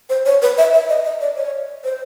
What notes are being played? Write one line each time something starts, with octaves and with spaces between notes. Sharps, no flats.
C5
C#5
B4
E5
E5
D#5
D#5
D5
C#5
C5